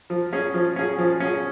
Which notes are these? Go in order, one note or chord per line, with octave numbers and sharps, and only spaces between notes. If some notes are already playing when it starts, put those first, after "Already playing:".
F3
C#4 G#4
F3
C#4 G#4
F3
C#4 G#4